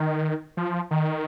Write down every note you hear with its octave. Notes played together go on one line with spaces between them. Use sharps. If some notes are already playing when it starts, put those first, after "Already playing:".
Already playing: D#3
F3
D#3